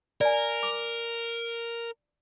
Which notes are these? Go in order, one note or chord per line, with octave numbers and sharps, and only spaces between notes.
A#4 D5 G#5
D6